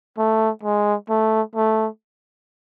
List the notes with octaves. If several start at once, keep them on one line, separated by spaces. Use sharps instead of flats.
A3
G#3
A3
A3